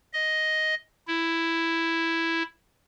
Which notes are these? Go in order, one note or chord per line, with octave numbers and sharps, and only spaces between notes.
D#5
E4